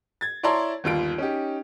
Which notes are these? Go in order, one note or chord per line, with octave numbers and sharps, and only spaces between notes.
G#6 A6
E4 C#5 D5 A5 A#5 C6
G1 D#2 F4 D7
C#4 D#4 G4